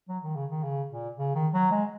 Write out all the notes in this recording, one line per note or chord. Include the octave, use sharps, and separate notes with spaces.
F#3
D#3
C#3
D#3
C#3
A#2
C#3
D#3
F#3
G#3